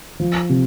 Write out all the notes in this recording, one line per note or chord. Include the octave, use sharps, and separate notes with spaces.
F3
C3